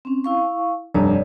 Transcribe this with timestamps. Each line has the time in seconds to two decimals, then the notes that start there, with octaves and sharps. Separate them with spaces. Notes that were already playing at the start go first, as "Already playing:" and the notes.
0.05 C4 C#4
0.24 E4 F5 C#6
0.94 F1 G2 C#5 D5 A#5